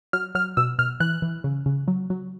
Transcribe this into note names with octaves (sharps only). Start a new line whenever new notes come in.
F#3 F6
F#3 F6
B2 E6
B2 F6
E3 F#6
E3
C#3
C#3
F#3
F#3